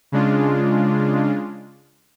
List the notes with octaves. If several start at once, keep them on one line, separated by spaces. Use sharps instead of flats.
C#3 G#3 D4 F4